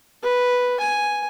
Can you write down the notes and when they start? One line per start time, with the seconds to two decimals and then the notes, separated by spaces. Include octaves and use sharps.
0.23 B4
0.80 G#5